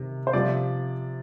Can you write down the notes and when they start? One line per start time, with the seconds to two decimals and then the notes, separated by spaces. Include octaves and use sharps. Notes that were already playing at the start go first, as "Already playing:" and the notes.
Already playing: C3 D#3
0.27 C5
0.33 C3 F3 D5